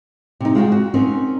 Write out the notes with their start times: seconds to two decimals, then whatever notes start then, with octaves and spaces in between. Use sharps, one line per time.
0.40 C3 D#4
0.55 G#3 F4 F#4 G5
0.72 F#4
0.94 C4 C#4 D#4 A#4